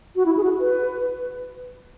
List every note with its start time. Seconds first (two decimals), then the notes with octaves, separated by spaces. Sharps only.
0.16 F#4
0.26 E4
0.37 G#4
0.43 F#4
0.60 B4